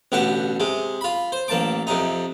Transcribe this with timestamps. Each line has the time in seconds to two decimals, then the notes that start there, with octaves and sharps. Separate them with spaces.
0.12 A1 B2 D3 G4 F#5
0.60 C3 G#3
1.01 F4 B5
1.32 C5
1.48 A1 A#3 A5 D6
1.87 F2 C3 D#4